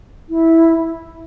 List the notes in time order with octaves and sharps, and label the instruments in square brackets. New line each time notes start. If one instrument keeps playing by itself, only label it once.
[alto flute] E4